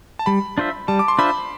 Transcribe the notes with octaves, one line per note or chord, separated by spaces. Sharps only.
A5
G3 B5
D4 F4 C5 E5
G3 A5
D6
C6
D4 F4 C5 E5 B5